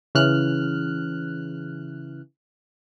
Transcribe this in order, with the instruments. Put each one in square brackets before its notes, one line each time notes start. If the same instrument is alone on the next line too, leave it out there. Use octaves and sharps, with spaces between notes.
[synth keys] C#3 E3 F6 F#6